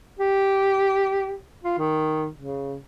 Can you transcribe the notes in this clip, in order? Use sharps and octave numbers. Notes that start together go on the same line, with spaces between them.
G4
F4
D#3
C#3